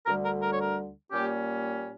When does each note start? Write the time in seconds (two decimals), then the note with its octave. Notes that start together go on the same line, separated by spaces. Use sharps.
0.06 D2 D3 G3 A#4
0.24 A#4
0.41 A#4
0.52 C#5
0.59 A#4
1.11 A#2 G3 A#3 C#4 G4